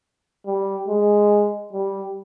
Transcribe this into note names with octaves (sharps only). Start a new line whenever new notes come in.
G3
G#3
G3